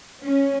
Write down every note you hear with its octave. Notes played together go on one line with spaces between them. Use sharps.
C#4